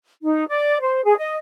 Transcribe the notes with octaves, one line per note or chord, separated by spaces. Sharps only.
D#4
D5
C5
G#4
D#5